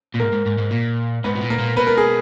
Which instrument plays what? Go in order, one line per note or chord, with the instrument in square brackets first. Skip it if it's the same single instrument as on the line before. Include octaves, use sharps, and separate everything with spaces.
[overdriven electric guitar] A#2
[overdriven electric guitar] G#2 [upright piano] A#3 A#4
[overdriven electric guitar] G#2
G#2
G#2
A#2
[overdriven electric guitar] G#2 [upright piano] B3 B4
[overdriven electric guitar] B2
A#2
[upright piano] A#3 A#4
[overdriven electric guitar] A#2
[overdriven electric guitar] B2 [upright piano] B4
[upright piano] A#4
G#4